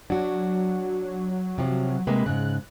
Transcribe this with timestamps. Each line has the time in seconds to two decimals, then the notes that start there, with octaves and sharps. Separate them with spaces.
0.10 F#3 D4 F#4
1.58 C3 F3
2.07 C3 G#3 A#3 B4
2.26 G#2 C#3 F#6